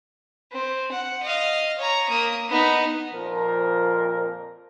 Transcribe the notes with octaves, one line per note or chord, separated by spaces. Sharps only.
C4
F#5
D#5 F5
C#5 A#5
A#3 D#6
B3 D#4
F2 A#2 F3 A#4